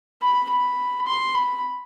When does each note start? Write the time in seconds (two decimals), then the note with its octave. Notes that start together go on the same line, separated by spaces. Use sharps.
0.21 B5
0.49 B5
1.06 C6
1.35 B5